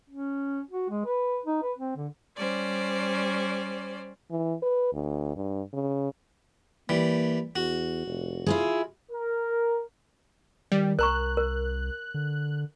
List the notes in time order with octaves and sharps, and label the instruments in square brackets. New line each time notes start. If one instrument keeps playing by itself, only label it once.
[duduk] C#4
F#4
G#3
B4
D#4
B4
C4
D3
[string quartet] G3 C#4 C5 D5
[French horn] E3
B4
D2
G2
C#3
[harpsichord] E3 G3 [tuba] A#3
[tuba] E2 [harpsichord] F#4
[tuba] F1
[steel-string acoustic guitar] E4 F4 G#4
[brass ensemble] A#4
[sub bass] D#3 [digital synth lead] G3
[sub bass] C2 [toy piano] A#4 A#5 C#6 [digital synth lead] F#6
[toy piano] A#4
[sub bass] D3